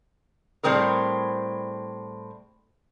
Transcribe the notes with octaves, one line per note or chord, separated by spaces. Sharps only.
A2 G3 C4 G#4 A#4